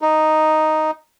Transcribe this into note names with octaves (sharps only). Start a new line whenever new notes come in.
D#4